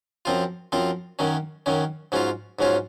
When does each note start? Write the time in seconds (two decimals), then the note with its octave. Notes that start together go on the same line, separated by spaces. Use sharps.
0.25 F#2 F3 C4 F4
0.72 F#2 F3 C4 F4
1.19 F#2 D#3 F#3 C#4
1.66 F#2 D#3 F#3 C#4
2.12 G#2 F#3 C#4 F4
2.59 G#2 F#3 C#4 F4